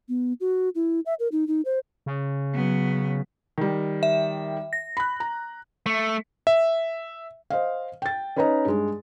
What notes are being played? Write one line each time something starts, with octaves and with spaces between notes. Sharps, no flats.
B3
F#4
E4
E5
A#4
D#4
D#4
C5
C#3
F#3 B3
D#3 G3
E5
A#6
B5 F#6
A#5
A3
E5
C5 D#5 F5
G5 A6
C#4 D#4 B4 C#5 D#5 A#5
G2 G#3